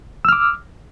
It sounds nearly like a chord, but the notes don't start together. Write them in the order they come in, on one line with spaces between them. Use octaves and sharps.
E6 F6 D6